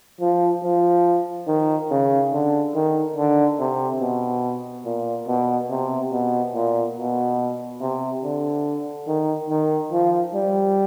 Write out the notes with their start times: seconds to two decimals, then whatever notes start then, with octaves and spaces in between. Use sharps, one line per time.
0.21 F3
0.64 F3
1.47 D#3
1.91 C#3
2.32 D3
2.75 D#3
3.16 D3
3.60 C3
4.01 B2
4.85 A#2
5.28 B2
5.70 C3
6.12 B2
6.55 A#2
6.96 B2
7.81 C3
8.23 D3
9.07 D#3
9.49 D#3
9.92 F3
10.34 G3